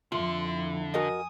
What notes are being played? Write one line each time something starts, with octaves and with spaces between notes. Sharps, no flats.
F2 D3 F4 E5 C6
E4
F#4 A#4 D#5 G#5 D#6